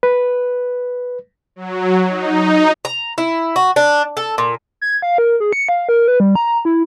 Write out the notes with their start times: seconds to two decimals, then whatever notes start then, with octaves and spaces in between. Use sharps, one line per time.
0.03 B4
1.56 F#3
2.09 D#4
2.85 A#5
3.18 E4
3.56 F#4
3.76 D4
4.17 A4
4.38 A#2
4.81 G#6
5.02 F5
5.18 A#4
5.40 G#4
5.53 C#7
5.69 F5
5.89 A#4
6.08 B4
6.20 G3
6.35 A#5
6.65 E4